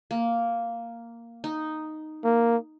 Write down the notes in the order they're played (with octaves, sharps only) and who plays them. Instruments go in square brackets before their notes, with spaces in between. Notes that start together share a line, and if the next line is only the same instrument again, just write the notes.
[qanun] A#3
D#4
[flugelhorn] A#3